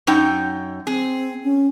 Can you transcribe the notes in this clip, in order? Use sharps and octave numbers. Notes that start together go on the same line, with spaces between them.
F#2 D#4 G5
C4 G#4
C#4